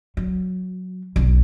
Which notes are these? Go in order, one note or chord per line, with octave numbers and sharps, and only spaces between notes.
F#3
B1 E2